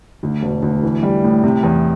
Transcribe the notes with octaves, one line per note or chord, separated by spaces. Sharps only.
D2
E1
D2
E3
G3
A2
C3
E2